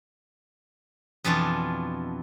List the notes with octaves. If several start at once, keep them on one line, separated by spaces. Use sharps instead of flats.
F2 B2 E3 D4 F4